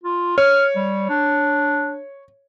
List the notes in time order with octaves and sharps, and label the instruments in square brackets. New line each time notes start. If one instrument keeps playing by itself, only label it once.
[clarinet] F4
[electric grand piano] C#5 [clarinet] F6
[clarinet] G3
D4